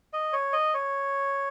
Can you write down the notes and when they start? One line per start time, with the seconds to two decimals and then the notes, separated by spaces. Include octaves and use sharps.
0.13 D#5
0.33 C#5
0.53 D#5
0.74 C#5